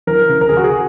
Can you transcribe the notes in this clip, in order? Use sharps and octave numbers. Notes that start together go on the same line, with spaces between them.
E3 A#4
C#3
A#4
G#4
C#3 F#4
G#4